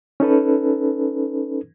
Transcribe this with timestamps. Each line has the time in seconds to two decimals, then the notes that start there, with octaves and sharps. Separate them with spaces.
0.20 C#4 D#4 A4 B4